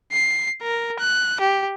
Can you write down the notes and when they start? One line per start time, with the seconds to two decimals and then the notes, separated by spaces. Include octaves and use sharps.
0.12 C7
0.63 A#4
1.00 F#6
1.40 G4